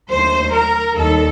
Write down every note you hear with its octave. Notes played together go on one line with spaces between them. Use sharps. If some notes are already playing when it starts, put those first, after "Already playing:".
D#2 D3 F#3 A3 C5
A#4
D#2 D#3 G3 A4